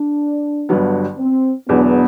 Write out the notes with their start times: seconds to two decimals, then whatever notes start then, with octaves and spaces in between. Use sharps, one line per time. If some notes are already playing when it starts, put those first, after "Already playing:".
Already playing: D4
0.69 G1 G2 D3 F#3 B3
1.19 C4
1.69 E1 E2 D3 F#3 B3